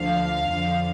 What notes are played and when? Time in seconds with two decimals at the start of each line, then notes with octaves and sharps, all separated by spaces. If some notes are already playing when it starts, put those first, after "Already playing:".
Already playing: D2 D3 F3 F5
0.51 F2 D3 F3